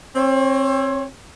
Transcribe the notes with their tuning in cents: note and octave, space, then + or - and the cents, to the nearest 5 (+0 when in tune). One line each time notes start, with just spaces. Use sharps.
C4 +30 C#5 +0